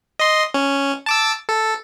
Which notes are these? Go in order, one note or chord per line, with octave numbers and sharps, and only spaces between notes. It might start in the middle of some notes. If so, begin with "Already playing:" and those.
D#5 C6
C#4
A5 D6 E6
A4